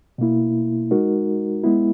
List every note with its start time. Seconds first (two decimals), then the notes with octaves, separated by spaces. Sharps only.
0.18 B2 A#3 E4
0.91 G#3 D#4 F#4 A#4
1.64 G#3 B3 E4